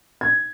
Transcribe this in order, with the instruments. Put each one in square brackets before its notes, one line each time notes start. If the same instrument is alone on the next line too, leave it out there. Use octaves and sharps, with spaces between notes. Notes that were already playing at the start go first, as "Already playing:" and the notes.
[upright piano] G#6